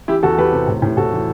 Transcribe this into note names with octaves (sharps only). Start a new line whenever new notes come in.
E3 E4 G4
E2 F#4 A4
E2 G4 B4
C3
A2
A2
A2 F#4 A4
E3